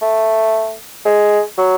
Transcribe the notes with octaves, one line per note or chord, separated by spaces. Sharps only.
A3
G#3
F#3